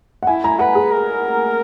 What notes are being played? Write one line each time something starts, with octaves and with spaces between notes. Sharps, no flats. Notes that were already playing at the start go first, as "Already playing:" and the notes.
F#5
E4 G#5
A#5
B4 F#5
G#4
A#4